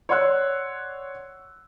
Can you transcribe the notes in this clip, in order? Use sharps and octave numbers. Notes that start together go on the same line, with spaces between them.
C#5 D5 F#5 C6 E6 F#6